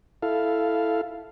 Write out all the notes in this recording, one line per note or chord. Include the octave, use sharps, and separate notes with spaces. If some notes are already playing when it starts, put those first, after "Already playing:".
E4 A4 F5